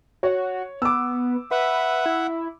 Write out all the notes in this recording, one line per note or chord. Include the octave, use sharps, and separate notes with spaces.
F#4 C#5
B3 D6 E6
B4 E5 F#5
E4